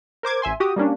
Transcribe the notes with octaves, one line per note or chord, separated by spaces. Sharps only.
A#4 C5 D6 G#6
A1 E5 G#5 C6
F#4 G4 D#6
G3 A#3 C#4 D4